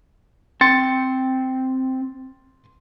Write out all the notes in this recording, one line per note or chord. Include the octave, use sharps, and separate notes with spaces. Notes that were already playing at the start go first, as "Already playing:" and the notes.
C4 G5 C6 A6 C#7